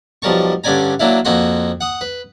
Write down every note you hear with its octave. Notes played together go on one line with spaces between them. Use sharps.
B1 F3 G3 A#4 A5 C#6
G2 D3 C#4 D5 G#5 A#5
F#3 A#3 D4 E4 F5
F2 A#3 F#4 C6
F#5 D#6
B4